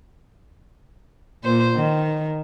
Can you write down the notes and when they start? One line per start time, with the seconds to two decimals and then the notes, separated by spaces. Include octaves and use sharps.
1.44 A#2 C5
1.76 D#3